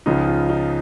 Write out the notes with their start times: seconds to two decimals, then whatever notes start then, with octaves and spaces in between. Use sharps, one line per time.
0.06 C#2 C#3 F3 D#4
0.28 F4
0.49 D#4